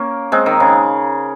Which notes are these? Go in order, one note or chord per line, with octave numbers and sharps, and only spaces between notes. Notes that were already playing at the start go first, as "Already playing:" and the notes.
Already playing: A#3 C#4
G#3 C4
D#3
C#3